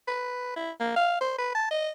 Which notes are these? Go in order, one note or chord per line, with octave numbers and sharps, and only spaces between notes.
B4
E4
A#3
F5
C5
B4
A5
D#5